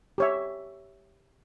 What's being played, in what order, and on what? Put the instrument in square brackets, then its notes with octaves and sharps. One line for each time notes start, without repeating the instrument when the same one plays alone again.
[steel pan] G4 C#5 E5